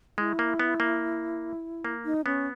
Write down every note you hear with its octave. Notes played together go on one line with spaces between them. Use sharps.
G#3 E4
A#3
B3
A#3
A#3
D#4
B3 C#4